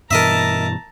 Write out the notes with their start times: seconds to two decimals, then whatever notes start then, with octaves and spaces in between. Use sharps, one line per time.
0.11 G2 B2 E3 A#4 D#5 E5 A5 A#5